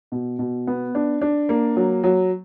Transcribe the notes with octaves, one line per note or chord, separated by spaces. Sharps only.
B2
B2
B3
D4
D4
A#3
F#3
F#3